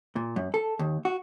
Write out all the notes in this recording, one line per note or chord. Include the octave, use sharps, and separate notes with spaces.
A#2
F#2
A4
D#2
F#4